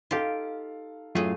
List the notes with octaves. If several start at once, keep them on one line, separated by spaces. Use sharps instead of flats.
D#4 F4 G4 A4 F5
F#2 A2 A3 F4 G#4